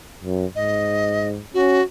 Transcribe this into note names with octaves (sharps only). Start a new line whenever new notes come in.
F#2
G#2 D#5
C#4 F#4